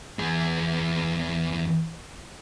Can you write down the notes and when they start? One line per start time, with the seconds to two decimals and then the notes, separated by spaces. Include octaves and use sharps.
0.19 E2 G#4